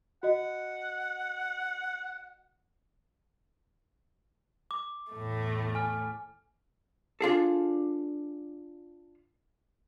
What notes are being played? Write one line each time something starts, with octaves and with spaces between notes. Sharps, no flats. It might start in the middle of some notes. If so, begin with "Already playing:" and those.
F#4 D#5 F#5
D6
E2 A2 A3
G#5 F6
D4 F4 G#4 A4